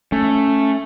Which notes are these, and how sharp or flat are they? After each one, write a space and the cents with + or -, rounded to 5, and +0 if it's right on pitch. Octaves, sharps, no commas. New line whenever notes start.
A3 +5 C#4 +0